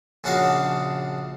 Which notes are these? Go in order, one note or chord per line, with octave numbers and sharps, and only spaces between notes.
A#1 C#3 D4 F#4 D#5 F5